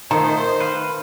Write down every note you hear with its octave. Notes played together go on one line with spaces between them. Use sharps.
D#3 A3 F4 A4 C5 A#5
B4 F5